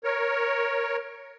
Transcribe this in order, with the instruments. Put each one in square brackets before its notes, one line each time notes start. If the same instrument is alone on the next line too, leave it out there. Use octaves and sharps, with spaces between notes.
[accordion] A#4 C#5